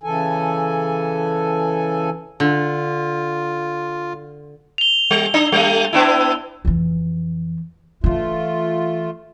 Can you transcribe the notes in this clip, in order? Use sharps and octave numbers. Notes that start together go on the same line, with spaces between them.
C#3 E3 A4 G#5
D3 F4
F7 G7
G3
D4
G3 A3
B3 D4 E4
F2 E3
E3 A3 D4 F4